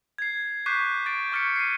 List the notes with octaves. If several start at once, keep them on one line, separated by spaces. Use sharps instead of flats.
G#6 C7
C#6 D6 F#6 G6 B6 C7
C#6 A6 D7
C#6 D6 F6 A6 B6 C#7
C7 D#7